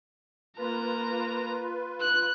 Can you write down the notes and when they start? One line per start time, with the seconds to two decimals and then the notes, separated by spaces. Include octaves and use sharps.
0.58 A#3 F4 B4 A#5
2.01 F#6